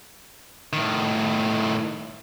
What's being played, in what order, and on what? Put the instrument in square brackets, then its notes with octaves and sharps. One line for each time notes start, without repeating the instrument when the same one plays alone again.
[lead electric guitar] A2 D#3